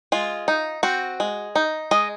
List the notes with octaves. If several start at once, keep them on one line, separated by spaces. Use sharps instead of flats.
G#3 F4
D#4
C4 F#4
G#3
D#4
G#3 D#5